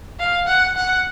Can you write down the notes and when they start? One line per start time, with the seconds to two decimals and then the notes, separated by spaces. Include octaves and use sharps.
0.19 F5
0.47 F#5
0.76 F#5